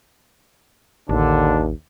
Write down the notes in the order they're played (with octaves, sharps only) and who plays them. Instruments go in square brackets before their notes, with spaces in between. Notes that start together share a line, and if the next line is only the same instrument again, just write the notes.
[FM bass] A1 [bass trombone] D#2 [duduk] D3 [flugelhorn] D4